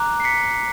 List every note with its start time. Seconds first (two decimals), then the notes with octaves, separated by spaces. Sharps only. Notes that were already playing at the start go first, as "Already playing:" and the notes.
Already playing: A#5 D6 F#6
0.20 C7
0.24 B6 C#7